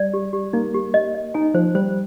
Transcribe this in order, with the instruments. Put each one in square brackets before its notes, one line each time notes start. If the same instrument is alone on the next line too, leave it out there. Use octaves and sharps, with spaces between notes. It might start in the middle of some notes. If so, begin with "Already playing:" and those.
Already playing: [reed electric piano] G3 [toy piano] D5
[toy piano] G4
G4
[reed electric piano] A#3 [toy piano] D#4
[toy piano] G4
D#5
D#5
[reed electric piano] D#4 [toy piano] G#5
[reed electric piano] F3 [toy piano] C5
[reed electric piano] G3 [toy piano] C5